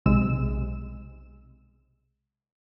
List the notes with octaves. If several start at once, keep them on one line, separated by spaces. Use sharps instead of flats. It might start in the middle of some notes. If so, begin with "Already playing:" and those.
B1 C3 G#3 E6 E7